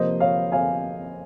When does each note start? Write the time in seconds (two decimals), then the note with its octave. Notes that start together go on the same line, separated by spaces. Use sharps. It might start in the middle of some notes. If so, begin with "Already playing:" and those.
Already playing: C3 F3 A#3 C5 D#5
0.20 C#5 F5
0.52 F5 G#5